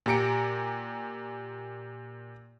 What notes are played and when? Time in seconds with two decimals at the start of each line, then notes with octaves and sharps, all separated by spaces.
0.06 A#2 G4 A#5 C#7 D7